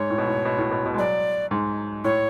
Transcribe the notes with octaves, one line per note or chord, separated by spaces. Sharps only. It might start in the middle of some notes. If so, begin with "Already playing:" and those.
Already playing: G#2 C#5
A2
B2
A2
B2
A2
B2
B2
G#3
F#3 D5
G#2
A2 C#5